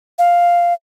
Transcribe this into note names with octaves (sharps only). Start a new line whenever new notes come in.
F5